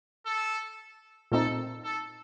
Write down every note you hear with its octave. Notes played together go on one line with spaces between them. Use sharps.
A4
A#2 A3 C4 D#4 A4
A4